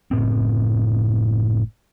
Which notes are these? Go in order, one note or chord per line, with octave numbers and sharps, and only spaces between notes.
F#1 A2 C4